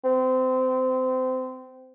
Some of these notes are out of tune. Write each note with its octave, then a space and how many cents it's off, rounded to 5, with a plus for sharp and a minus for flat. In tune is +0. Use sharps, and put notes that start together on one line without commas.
C4 -25